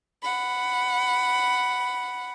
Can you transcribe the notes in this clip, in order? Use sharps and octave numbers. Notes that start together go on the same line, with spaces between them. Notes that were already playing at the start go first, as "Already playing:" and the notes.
F#5 B5